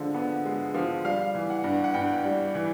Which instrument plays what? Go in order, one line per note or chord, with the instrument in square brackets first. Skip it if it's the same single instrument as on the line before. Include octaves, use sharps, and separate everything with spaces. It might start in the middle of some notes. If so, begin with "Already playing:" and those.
Already playing: [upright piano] D3 F3 G#3
B3
G#3
F3
G3 F5
E3
F#5
G2
F#5
G2 G5
G3
E3